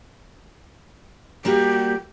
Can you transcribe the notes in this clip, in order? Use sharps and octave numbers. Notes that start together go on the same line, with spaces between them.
G3 A#3 F#4 G4